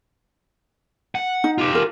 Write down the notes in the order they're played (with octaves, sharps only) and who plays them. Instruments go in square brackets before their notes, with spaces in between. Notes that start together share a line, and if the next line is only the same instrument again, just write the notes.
[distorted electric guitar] F#5
[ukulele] D#4
[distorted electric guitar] F4 G4
[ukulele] A#4